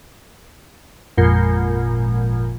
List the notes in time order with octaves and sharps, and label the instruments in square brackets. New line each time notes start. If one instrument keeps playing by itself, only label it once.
[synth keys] G#1 F2 A#2